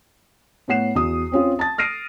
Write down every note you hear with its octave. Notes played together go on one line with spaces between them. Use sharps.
A2 B3 C#5 F#5 C7 E7
E2 F#4 D#6
C4 C#4 F4
A5 A6
F6 A#6 C7 D7 D#7